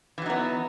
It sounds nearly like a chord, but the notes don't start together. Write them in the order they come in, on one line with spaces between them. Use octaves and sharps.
E3 F#3 D#4 B3